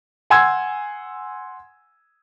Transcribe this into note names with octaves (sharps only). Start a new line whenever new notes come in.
F#5 G#5 C6 E6 G#6